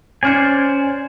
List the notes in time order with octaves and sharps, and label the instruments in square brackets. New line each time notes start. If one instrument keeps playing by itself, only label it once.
[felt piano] C#4 F6 C#7 [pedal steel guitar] C5 D5 G#5